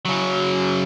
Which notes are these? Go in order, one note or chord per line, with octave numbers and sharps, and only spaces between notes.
C#3 F#3